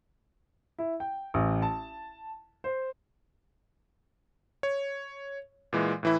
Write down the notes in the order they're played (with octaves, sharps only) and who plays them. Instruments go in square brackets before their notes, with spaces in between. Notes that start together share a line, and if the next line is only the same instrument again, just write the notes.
[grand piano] E4
G5
A1
A5
C5
[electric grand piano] C#5
A#2 E3 G#3
A2 E3 E4